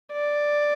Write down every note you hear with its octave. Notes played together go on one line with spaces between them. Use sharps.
D5